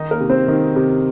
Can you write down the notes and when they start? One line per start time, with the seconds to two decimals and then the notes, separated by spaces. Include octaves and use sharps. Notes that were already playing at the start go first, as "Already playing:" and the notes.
Already playing: D#3 D#4 D#5
0.11 A#3 A#4
0.20 C3
0.30 C4 C5
0.48 D#3
0.76 C3